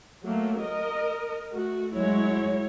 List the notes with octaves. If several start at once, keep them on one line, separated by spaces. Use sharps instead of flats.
F#3 A3 A#3
A#4 D#5
A3 F#4
F#3 G#3 E4 C#5